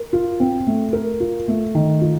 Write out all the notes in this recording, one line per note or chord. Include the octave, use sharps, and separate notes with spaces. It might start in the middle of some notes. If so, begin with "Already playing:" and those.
Already playing: A#4
F4
C4
A3
A#4
F4
A3
D#3
F4